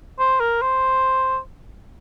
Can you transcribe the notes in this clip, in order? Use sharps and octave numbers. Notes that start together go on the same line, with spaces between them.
C5
A#4
C5